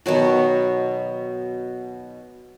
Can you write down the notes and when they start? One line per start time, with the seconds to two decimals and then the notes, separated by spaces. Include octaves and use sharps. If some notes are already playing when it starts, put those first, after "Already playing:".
0.06 B2 D#3 F#3 F#4